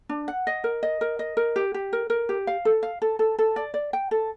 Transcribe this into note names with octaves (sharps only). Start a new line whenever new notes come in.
D4
F#5
D#5
A#4
D#5
A#4
D#5
A#4
G4
G4
A#4
A#4
G4
F5
A4
F5
A4
A4
A4
D5
D5
G5
A4